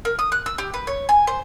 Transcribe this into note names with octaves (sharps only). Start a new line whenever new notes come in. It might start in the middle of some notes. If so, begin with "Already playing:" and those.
A#4
D#6
F#6
E6
G4
B4
C#5
G#5
C5